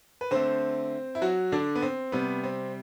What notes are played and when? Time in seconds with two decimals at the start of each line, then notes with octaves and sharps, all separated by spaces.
0.21 B4
0.31 D3 A3 C4 C5
1.15 E4
1.22 F#3 F#4
1.52 D3 D4
1.76 B3
1.82 C4
2.12 C3 G3 B3
2.43 C4